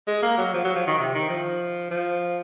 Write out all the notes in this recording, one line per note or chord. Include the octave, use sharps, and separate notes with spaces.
G#3
A#3
F#3
F3
F#3
F3
D#3
C3
D#3
F3
F3